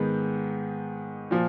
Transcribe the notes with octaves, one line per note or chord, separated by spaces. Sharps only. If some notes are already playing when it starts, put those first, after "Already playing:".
Already playing: G#2 D#3 G#3 B3
A#2 F3